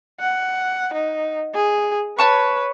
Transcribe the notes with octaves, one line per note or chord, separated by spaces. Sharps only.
F#5
D#4
G#4
B4 C#5 A5 C#6